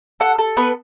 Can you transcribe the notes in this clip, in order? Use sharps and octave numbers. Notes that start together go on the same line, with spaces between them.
A4 F#5
A4
B3 B4